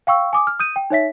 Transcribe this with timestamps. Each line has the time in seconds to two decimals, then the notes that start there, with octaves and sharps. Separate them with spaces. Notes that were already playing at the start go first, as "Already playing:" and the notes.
0.07 F5 G5 C#6 E6
0.33 G#5 D6 D#6
0.47 F6
0.59 D#6 G6 D#7
0.76 G5
0.90 D#4 C#5 E5 B6